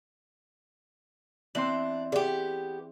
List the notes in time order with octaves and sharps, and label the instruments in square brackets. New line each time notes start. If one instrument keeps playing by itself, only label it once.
[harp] E3 C4 C6 [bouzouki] D4 [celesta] F#7
[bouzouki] B3 G4 [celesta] G#4 D5